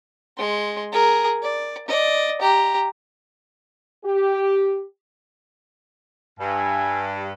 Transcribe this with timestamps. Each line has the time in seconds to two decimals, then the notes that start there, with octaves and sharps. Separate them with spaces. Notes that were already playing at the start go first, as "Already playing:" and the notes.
0.38 G#3 C6
0.92 G#4 A#4
1.42 D5
1.88 D5 D#5
2.41 G4 A#5
4.03 G4
6.40 G2 E5 G#5